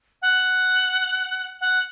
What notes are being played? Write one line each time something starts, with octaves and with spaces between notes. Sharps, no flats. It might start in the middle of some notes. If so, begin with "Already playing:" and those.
F#5
F#5